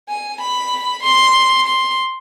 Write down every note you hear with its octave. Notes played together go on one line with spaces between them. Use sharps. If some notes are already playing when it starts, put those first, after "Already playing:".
G#5
B5
C6
C6